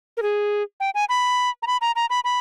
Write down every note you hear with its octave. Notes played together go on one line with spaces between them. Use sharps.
A#4
G#4
G5
G#5
B5
A#5
B5
A#5
A#5
B5
B5